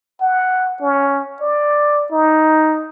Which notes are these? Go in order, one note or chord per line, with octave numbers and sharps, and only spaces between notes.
F#5
C#4
D5
D#4